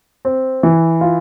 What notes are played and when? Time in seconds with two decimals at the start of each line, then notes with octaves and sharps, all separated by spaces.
0.25 C4
0.63 E3
1.01 F4